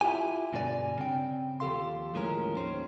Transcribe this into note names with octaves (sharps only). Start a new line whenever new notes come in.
E4 F4 G4 G#5
G2 B2 D3 D#4 D5 G#5
C#3 C4 G5
D#2 F3 G4 A4 F5 C6
D#2 A2 F3 G#3 C#4 A#4
D#2 D#3 C#4 C5